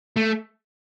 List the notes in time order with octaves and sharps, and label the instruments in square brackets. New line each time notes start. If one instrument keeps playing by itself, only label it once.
[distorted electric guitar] A3